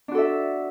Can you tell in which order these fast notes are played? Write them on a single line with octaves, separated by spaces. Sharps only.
D4 F#4 A4 E5